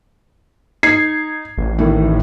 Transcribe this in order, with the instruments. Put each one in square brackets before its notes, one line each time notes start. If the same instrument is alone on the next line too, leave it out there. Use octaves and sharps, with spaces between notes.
[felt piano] D#4 G#6 C7
[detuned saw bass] A1
[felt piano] A2 D#3 E3